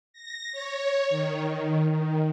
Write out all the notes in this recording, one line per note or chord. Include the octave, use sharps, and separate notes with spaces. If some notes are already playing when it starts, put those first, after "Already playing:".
A#6
C#5
D#3
D#3